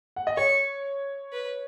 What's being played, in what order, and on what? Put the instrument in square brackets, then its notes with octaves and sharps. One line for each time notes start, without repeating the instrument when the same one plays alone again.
[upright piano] F#5
D#5
[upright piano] C#5 [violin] C#6
[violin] B4